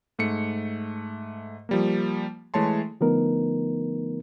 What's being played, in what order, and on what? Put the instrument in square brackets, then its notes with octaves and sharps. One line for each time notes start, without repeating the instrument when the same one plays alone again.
[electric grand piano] G#2 A3 C#7
F3 G3 A#3
E3 G#3 A3 C#5 A5 C6
[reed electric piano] D3 F3 A3 B3 D#4 A#4